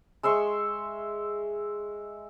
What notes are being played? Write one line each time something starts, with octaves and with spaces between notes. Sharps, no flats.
G#3 E5 C6 C#6